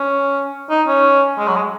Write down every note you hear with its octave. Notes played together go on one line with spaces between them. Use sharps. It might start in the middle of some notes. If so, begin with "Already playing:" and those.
Already playing: C#4
D#4
C#4
G#3
F#3
G#3